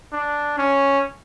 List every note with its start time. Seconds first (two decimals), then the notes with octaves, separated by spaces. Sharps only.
0.12 D4
0.58 C#4